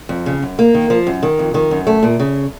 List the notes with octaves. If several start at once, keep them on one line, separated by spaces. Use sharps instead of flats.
F2
C#3
F#2
A#3
D#3
F3
F#2
D#3
F2
D#3
F#2
A3
A#2
C#3